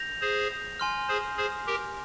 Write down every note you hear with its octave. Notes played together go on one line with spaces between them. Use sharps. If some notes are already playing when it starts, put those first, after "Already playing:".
Already playing: G6 A#6 F7
G#4 C5
G#5 C6 F6
G#4 C5
G#4 C5
G4 A#4